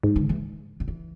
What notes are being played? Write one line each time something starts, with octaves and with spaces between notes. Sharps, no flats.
G#2 E3
D3
E3
D3
E3